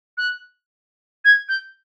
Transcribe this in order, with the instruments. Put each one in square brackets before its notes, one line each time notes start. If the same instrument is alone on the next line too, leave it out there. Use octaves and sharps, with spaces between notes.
[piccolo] F#6
G#6
G6